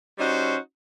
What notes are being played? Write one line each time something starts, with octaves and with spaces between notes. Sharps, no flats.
G3 C#4 D#4 F#4 C5